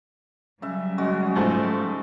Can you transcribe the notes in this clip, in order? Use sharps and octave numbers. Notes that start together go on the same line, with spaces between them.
C#3 F#3 G3 E5
C#3 G#3 F#4
G#2 F3 A3